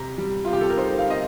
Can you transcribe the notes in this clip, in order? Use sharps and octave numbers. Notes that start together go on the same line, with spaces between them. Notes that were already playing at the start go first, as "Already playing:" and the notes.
Already playing: C3 A#5
G3
C3 F4
G4
A4
A#4
D#4 C5
F5
C4 D#5